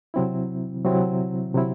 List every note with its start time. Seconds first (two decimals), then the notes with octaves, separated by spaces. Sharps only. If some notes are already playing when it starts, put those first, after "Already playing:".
0.14 C3 F#3 C4 E4
0.84 C3 F#3 C4 E4
1.55 C3 F#3 C4 E4